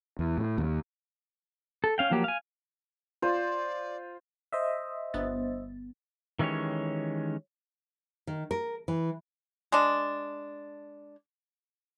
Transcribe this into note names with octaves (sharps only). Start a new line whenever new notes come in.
E2
A2
D#2
A4
C#4 F5 G5
F3 F#3 A#3 G4
F5 G#5
F4 C5 D5
C5 D#5 E5
G1 B3 A6
D#3 E3 G#3 C#4 G4 C#5
D#3
A#4
E3
G#3 D4